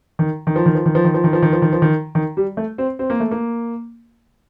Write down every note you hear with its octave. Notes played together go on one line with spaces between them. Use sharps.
D#3
D#3
F3
D#3
F3
D#3
F3
D#3
F3
D#3
F3
D#3
F3
D#3
F3
D#3
D#3
G3
A3
C4
C4
A#3
A3
A#3